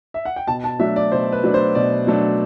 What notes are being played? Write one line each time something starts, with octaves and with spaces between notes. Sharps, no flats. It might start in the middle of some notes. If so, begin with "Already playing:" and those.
E5
F#5
G5
B2 A5
A5
F#3 A3 D4 E5
D5
B2 C5
B4
F#3 A3 D4
C5
B2 D5
F#3 A3 D4